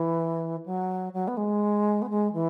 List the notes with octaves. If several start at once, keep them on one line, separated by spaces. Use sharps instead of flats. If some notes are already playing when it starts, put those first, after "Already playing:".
Already playing: E3
F#3
F#3
B3
G#3
B3
G#3
E3